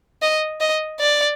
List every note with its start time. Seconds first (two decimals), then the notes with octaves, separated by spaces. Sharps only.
0.22 D#5
0.61 D#5
1.00 D5